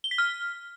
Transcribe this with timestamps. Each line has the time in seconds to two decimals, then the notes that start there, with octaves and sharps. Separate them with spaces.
0.04 G7
0.11 B6
0.18 F6